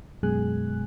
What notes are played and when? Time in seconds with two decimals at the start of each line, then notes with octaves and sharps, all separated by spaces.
0.23 F#2 B2 G#3 G#4 G#5 F#6